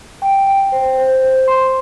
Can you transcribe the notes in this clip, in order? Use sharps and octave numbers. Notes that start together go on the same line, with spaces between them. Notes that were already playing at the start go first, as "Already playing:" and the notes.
G5
G5
C5
C5
C5
C6